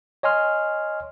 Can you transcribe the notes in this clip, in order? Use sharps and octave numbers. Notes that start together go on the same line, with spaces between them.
C#5 D#5 G#5 C6 F6